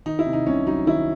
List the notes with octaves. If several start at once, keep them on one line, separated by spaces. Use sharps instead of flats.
D#3 D#4
E4
C3
D#4
C2 C#4
F#3 D#4
D#3 E4